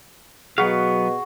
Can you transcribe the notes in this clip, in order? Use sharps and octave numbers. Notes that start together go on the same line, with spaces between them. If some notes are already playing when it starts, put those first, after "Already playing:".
B2 F#3 B3 F#4 G#4 F5